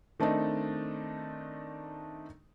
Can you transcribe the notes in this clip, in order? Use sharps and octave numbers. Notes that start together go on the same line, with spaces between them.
D#3 A3 C4 D4 D#4